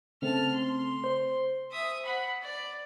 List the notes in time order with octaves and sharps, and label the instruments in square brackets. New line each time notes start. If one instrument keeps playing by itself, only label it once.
[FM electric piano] C#3 A3 C4 [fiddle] A5 F6
[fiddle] C6
[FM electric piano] C5
[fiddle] E5 D#6
F#5 B5
D5